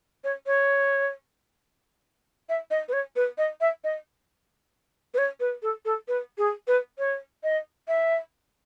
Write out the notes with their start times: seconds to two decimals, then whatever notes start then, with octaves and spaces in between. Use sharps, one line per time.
0.24 C#5
0.47 C#5
2.49 E5
2.71 D#5
2.88 B4
2.93 C#5
3.16 B4
3.38 D#5
3.61 E5
3.84 D#5
5.14 B4
5.18 C#5
5.40 B4
5.63 A4
5.85 A4
6.08 B4
6.38 G#4
6.67 B4
6.99 C#5
7.43 D#5
7.88 E5